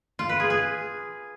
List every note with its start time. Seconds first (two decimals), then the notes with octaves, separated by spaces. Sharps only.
0.19 F4
0.29 B4
0.40 G#4
0.50 G#4